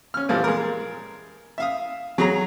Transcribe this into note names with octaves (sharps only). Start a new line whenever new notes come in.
C#4 F6
A#2 E3 F3 G3
G#3 A#4
E5 F5 D#6
F#3 G#4 A#5